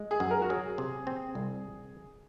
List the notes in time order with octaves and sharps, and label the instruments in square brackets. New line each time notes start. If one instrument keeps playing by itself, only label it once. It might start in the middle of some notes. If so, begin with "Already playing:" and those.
Already playing: [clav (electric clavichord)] G#3
[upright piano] G#4
[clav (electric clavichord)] F#2
[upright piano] A#4
F#4
[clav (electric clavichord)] F#3 [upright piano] G#4
[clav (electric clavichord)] C3
C4
C2